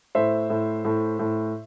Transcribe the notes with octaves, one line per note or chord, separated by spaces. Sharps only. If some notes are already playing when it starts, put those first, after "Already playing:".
A2 C5 E5
A2
A2
A2